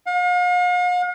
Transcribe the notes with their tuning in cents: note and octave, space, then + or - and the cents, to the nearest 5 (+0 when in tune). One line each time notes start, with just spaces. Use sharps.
F5 +45